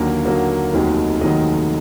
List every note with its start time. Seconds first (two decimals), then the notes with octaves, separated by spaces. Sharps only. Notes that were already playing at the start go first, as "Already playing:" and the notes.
Already playing: D#2 D3 F#3 A#3 A#4
0.25 D#2 D3 F#3 A#3
0.73 F1 D#2 D#3 F#3
1.20 F1 D#2 D#3 F#3 D#5